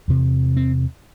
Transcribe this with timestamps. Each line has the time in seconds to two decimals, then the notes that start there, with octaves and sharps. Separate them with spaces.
0.08 E2 C3
0.57 C4